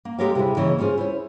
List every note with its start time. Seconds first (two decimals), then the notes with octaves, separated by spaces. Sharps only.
0.05 A#3
0.18 G#3 G4 A4 A#4 C#5 F5
0.35 C3 G3 E4 G#4
0.57 C#3 E3 A#3 C#5 D#5
0.78 C#4 E4 F4 G#4 C5
0.98 E4 C5 C#5